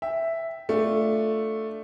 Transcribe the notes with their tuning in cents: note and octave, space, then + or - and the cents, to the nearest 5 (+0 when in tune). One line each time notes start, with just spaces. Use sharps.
E5 +0 G5 +0
A3 +0 D4 +0 F4 +0